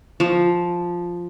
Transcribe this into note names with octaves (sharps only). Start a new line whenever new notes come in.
F3